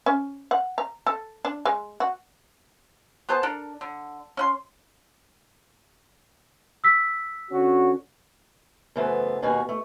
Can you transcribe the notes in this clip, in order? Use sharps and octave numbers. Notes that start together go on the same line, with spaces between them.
C#4
F#5
A#5
A4
D4
G#3
F#4
B3 G#4 C5 A5
D4 A4 A#4
D3
C#4 F#5 C6
E6 B6
D3 C#4 F#4
F#2 C#3 E3 A3 B3 C5
D#2 B2 A#3 F#4 G#5
A3